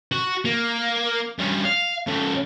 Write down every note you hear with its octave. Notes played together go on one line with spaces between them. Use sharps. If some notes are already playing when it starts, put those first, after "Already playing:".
F#4
A#3
G2 C#4
F5
C#3 A3